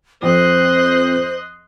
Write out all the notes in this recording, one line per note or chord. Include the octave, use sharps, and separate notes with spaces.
F2 C4 C5 D#5 C6 F#6